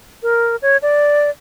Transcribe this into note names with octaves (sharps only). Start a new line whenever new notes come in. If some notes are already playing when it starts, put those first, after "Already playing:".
A#4
C#5
D5